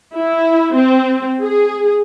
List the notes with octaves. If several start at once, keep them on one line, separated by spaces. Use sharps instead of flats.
E4
C4
G#4